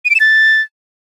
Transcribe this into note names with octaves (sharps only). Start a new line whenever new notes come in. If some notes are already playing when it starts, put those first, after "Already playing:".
D#7
D7
E7
A6